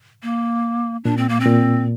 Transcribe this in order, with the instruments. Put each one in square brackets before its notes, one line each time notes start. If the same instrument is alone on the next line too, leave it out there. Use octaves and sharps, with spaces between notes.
[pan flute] A#3
[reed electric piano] A#2 [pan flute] D4
[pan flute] C4
A#3
C4
[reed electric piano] A#2